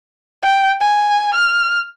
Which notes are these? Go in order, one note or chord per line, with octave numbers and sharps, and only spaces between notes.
G5
G#5
F6